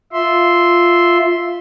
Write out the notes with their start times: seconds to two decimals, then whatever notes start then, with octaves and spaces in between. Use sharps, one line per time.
0.13 F4 E5 C6